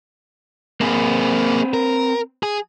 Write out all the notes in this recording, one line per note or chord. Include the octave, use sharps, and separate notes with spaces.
A#3 C4 G#4 B4
A#4
G#4